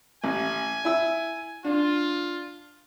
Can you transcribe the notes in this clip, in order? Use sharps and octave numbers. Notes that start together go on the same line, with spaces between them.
A1 G#5
E4 E6
D4 F4